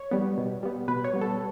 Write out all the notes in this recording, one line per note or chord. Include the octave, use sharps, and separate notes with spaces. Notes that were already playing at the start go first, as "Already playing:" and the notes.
Already playing: C#5
G3 B3
B2
G3 B3
B2 B4
C#5
G3 B3
A4